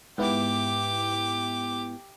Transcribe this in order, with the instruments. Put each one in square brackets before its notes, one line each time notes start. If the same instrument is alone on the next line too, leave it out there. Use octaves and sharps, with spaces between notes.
[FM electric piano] G#2 B3 E4 [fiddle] G4 D6